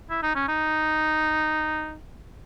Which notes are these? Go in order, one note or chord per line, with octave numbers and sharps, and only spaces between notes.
E4
D#4
C#4
D#4